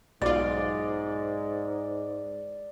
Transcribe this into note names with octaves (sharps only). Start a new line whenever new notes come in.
B1 G#2 F4 D5